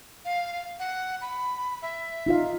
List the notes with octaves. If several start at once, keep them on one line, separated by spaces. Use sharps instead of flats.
F5
F#5
B5
E5
D#4 F4 F5